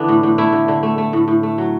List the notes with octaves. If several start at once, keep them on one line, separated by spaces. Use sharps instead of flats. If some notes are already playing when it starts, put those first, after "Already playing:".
Already playing: D3 E3 B3 D4
A2
A2
A3 E4
D3
D3
A3
A3
A2
A2
A3
F#3